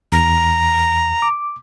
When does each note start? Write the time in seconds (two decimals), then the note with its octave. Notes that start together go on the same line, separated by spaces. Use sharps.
0.12 E2 A#5
1.22 D6